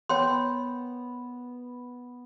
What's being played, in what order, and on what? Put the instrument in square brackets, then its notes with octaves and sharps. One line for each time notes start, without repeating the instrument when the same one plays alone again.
[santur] B3 [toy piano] C#5 G5 C6